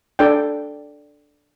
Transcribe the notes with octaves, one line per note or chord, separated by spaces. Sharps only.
D4 A4 D5 G5